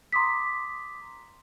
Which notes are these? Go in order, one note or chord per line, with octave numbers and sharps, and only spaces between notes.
A#5 C6 D6 D#6 B6